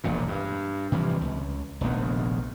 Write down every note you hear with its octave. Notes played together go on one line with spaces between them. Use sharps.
E1 A#1 F2 A#2
G2
C3 E3 F3 G3
C#2
F1 A#1 D#3 B3